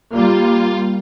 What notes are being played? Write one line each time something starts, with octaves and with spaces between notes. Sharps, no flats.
G3 A#3 F4